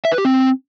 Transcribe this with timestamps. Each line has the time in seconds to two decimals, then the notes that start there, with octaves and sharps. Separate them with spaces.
0.05 E5
0.11 B4
0.18 G4
0.25 C4